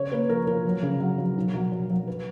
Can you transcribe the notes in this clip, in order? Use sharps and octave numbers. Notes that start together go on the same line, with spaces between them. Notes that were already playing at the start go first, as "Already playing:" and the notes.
Already playing: C#3 C#5
A#3 B4
F3 A#4
F3 A#4
F#3
C#3
F#3
F#3
B1
F#3
F#3
F#3
B4